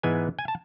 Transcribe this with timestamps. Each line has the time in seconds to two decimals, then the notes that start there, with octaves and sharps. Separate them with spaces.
0.03 G#2 E3 G#3 B3 G#5
0.39 G#5
0.48 A5